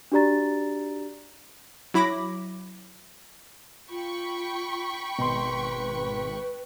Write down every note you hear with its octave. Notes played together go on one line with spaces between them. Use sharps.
D4 F#4 G4 D5 A#5 A6
F#3 E4 B5 D6 A#6
F4 G5 B5 C#6
G#1 B2 B4 C6